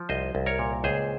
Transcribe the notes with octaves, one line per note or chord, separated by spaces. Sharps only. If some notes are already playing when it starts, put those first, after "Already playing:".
Already playing: F3
C2 C5 D#5
C2
A#4 C#5
A#2
C#2 G#4 C5